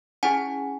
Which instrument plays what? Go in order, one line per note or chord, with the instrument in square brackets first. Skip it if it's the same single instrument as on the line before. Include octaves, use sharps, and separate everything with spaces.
[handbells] C#4 E4 G#4 F#5 G#5